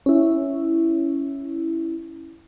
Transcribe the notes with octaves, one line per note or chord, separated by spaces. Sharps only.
C#4 E4